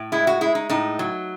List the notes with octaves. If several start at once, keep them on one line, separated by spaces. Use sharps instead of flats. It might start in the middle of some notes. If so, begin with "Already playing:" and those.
Already playing: A2
G#3 E4
F#4
G#3 E4
D#4
A2 D#4
F#3